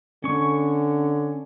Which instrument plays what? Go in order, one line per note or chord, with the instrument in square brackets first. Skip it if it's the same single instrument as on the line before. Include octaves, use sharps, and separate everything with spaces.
[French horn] D3 [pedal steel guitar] C#4 C#6